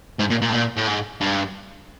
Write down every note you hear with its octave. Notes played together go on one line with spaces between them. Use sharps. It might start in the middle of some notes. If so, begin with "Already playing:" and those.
G#2
A#2
A#2
A2
A#2
A2
G#2
G2